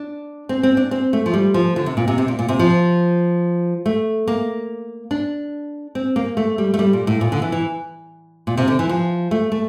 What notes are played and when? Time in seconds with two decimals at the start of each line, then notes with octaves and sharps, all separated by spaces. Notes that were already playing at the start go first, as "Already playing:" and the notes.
Already playing: D4
0.49 C4
0.63 C4
0.77 D4
0.91 C4
1.13 A3
1.26 F3
1.34 G3
1.54 F3
1.76 D3
1.86 C3
1.97 A#2
2.08 C3
2.18 C3
2.28 A#2
2.39 A#2
2.49 C3
2.59 F3
3.86 A3
4.28 A#3
5.11 D4
5.95 C4
6.16 A#3
6.37 A3
6.58 G3
6.74 A3
6.79 G3
6.93 A#2
7.07 A2
7.21 A#2
7.32 D3
7.42 E3
7.52 E3
8.47 A#2
8.57 C3
8.68 D3
8.79 E3
8.89 F3
9.31 A3
9.52 A3